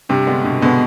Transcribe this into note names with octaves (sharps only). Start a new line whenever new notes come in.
G2 C3
D3 G#3 B3
G2 B2
B2 D3 G#3 B3